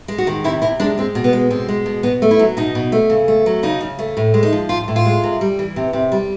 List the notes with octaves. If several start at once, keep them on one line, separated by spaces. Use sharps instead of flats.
G#3
F#4
D#3
C3 E4
C3 E4
G#3 D4
G#3 C4
B2
B3
G#3
B2 C4
G#3
B2
B2 B3
A3
E4
F#3
B2 D#4
B2
A3
C#3
A3
F#3
C#3 D#4
C#3
A3
A2
G#3
D#4
F3
A2 F4
A2
F4
G#3
C3
G3
E3
C3
C3
G3